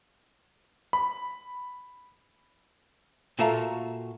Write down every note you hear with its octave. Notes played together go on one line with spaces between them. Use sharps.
B5
A#2 F#4 A4 E5 F5 A#5